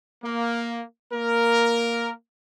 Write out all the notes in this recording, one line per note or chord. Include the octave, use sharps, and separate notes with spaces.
A#3
A#3 A#4